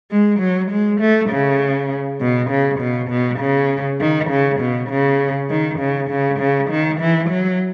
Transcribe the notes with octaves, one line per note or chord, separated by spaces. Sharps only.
G#3
F#3
G#3
A3
C#3
B2
C#3
B2
B2
C#3
D#3
C#3
B2
C#3
D#3
C#3
C#3
C#3
D#3
E3
F#3